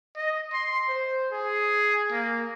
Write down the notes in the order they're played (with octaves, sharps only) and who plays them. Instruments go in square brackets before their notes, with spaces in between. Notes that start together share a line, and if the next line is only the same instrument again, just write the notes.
[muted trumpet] D#5
C6
C5
G#4
A#3